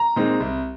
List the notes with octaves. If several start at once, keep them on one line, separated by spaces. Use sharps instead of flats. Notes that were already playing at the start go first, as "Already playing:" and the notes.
Already playing: A#5
A#2 G#3 C4 D#4
C2